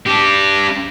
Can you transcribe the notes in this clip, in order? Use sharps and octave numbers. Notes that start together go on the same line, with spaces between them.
D4 G4